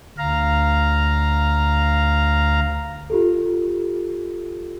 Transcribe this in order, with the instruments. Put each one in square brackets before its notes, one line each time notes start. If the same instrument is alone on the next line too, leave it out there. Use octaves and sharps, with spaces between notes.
[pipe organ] D2 F5 A#5
[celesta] F4 G4 A4